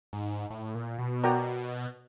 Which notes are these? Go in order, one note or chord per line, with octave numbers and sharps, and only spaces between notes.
G#2
A2
A#2
B2
F#4 A#4 D5 G5 A#5